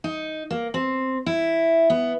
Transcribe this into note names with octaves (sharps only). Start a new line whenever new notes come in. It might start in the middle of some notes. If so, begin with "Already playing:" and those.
D#4
A#3
C4
E4
B3